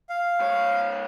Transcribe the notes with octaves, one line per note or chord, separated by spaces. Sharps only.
F5
G#2 C#5